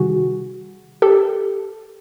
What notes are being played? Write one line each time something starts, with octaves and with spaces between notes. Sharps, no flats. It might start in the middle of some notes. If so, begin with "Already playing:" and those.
Already playing: C3 D#3 G3 F#4 G#4
G4 A4